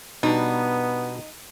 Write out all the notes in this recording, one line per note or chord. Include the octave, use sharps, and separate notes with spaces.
B2 G3 B3 D4 D#4